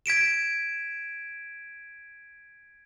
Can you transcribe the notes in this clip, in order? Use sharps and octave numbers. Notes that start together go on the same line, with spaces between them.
G#6 B6 D7 E7